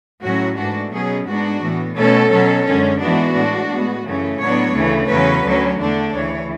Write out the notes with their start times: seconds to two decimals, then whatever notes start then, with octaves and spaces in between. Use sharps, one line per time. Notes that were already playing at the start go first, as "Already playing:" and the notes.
0.22 A2 F#3 C#4 F#4
0.57 G#2 E3 A3 D4 F#4
0.92 B2 F#3 C#4 G#4
1.26 G#2 G#3 B3 D4 F#4
1.61 A2 E3 B3
1.96 B2 A3 C#4 A4
2.31 B2 F#3 C#4
2.66 F#2 D3 G#3 C#4
3.00 G#2 E3 G#3 B3 D4 F#4
3.35 A2 G#3 D4
3.70 A2 G#3 B3
4.05 F#2 C#3 E3 A3 C#4
4.39 A2 F#3 B3 D4 C#5
4.75 D2 C#3 E3 A3
5.08 E2 C#3 F#3 C#4 B4
5.44 D2 D3 F#3 C#4
5.78 E2 D3 A3 D4
6.13 D2 C#3 E3 C#5